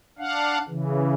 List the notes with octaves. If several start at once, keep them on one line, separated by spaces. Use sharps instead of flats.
D4 F5 F#5
C#3 E3